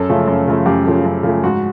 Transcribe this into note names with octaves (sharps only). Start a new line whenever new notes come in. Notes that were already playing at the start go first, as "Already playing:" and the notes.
Already playing: F#2 A4
C#3 F3 A3
F#2
C#3 F3 A3
F#2 G4
C#3 F3 A3
F#2
C#3 F3 A3
G#2 F#4